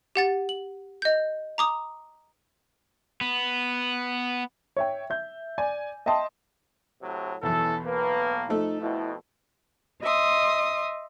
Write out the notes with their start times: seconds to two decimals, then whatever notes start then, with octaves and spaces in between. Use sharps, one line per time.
0.16 G4 F#5 A6
0.49 F#7
1.02 D#5 G6
1.58 A#5 D6 D#6
3.21 B3
4.77 C#5 E5 G5
5.10 E5 G6
5.58 D5 G#5
6.06 D#5 E5 G5 A5 C6 D#6
7.02 A2 C3 F#3
7.43 B1 E2 C#4 E4 A4
7.87 A2 A#3 B4
8.50 F3 A3 D#4 A4
8.81 F2 B2 E4
10.01 D#5 E5 C6 D#6